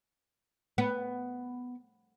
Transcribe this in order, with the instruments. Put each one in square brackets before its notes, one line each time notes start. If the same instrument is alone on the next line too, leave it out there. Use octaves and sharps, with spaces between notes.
[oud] B3